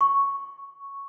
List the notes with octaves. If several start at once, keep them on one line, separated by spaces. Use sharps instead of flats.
C#6